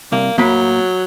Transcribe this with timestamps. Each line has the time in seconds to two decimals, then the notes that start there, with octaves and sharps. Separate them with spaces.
0.12 C2 A#3
0.38 A2 F#3 A#3 B5